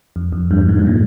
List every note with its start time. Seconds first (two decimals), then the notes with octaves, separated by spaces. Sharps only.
0.16 F2
0.32 F2
0.51 G2
0.61 G2
0.69 G#2
0.79 G#2
0.87 A#2